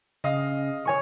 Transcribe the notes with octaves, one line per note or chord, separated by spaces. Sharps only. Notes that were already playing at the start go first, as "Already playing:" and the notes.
C#3 D#5 F5 D#6
C#5 G#5 C#6